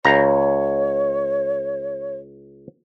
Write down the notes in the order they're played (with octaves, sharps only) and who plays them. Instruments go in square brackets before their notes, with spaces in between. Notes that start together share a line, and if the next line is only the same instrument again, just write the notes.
[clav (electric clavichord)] C#2 A#5 [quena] C#5